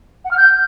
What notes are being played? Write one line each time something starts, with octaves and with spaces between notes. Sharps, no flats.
F#5
F6
G6